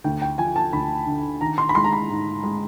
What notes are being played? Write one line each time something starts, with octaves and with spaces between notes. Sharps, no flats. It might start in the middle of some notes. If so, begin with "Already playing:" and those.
D2 G5
G5
F3 G#5
A5
D2 B5
D3
D#3 A#5
C6
B5
G#3 C6
A#5
B5
G#2
G#3